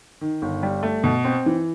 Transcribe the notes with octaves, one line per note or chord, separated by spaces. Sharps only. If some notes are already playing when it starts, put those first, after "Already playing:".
D#3
G1
G3
A3
B2
C4
E3